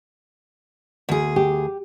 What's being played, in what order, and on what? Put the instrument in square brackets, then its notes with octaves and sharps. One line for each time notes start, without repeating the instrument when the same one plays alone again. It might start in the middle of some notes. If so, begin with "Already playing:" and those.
[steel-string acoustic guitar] D2 G#4
[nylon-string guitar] G4